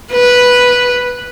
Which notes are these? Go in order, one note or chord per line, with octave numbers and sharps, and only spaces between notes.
B4